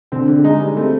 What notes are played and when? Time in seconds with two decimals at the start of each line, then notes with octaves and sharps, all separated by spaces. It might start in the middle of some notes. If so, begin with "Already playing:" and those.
0.12 D3 C4
0.28 D3
0.44 G#3 D#4
0.60 G3
0.76 A3 C4